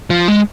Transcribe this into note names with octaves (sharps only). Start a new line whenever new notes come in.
F3
G#3